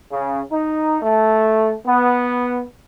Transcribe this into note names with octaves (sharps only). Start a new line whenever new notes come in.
C#3
D#4
A3
B3